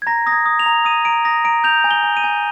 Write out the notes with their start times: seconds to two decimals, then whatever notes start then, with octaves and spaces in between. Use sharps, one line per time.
0.02 G#6
0.07 A#5 A#6
0.26 D#6 A#6
0.32 G#6
0.46 D#6
0.59 F7
0.66 A#5
0.85 D#6 D#7
1.05 A#5 D7
1.25 D#6 A#6
1.45 A#5 D7
1.64 G6 F7
1.84 G#5
1.91 G7
2.03 G#5
2.17 D#7
2.24 G#5